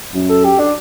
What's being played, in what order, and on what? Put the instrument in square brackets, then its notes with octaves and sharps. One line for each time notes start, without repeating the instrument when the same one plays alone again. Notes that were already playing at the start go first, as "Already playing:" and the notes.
[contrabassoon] F#2
[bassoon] A4
G4
D4